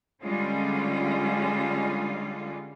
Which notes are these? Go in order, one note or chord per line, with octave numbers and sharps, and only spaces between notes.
D3 G3 G#3 C#4 F4